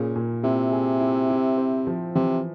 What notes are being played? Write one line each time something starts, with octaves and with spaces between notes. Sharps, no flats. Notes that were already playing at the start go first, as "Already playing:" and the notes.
Already playing: A#2 C#3 A#3
A#2
C3 E4
G#4
E4
E4
C4
F3
C3 E3